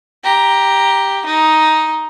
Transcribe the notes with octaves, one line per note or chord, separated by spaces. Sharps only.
G4 A#5
D#4